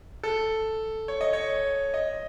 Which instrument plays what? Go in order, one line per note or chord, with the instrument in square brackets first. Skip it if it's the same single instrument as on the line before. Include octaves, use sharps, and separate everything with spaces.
[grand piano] A4
C#5
D#5
C#5
D#5